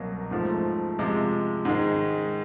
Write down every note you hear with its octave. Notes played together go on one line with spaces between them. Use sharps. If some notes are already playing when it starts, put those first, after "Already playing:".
Already playing: C2 B2 F#3 A#3
G#2 F3 A3
C3 F3 G#3
G#2 D#3 G#3